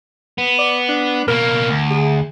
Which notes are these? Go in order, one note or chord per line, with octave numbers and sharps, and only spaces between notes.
B3
D5
D4
B2 A#3 A#4
D2
G#4